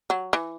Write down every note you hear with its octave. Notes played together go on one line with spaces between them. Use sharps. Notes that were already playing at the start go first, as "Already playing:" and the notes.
F#3
E3